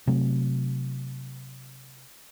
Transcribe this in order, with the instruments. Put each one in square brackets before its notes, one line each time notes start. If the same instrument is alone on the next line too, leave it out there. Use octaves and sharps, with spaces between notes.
[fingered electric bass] C3 F#3 A3